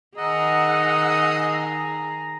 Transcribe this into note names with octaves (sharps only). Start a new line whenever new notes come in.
D#3 G#4 D#5 F#5 A#5 E6